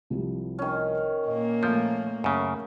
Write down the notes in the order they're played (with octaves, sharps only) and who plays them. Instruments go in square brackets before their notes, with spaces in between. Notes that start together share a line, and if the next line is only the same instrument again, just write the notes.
[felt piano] C2 F3 G3
[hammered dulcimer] D#3 C#4
[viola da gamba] A#2 A#3 [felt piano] D#5
[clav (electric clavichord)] F3 [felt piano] A3 F5 G6
[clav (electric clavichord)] F#2 C#3